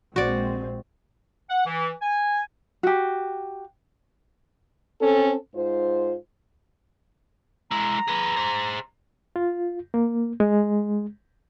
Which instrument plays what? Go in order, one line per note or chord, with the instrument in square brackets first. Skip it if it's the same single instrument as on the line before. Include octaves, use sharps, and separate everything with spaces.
[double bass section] A#1 G#3 C4 [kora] F#4 D5
[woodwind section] F#5
E3
G#5
[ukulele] F#4 G4
[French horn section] C4 C#4 A4
G#2 F4 C5
[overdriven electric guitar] G#3 E4 [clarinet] A#5
[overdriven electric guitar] G#4 B4
G#4 C5
[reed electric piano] F4
A#3
G#3